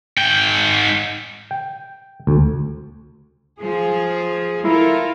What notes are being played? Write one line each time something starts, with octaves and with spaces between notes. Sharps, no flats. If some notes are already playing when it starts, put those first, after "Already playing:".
G#2 G5
G5
D2
F3 G#4
E4 F4 A4 A#4